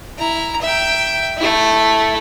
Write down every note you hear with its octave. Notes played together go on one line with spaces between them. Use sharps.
E4 A#5
E5 G5
A3 E4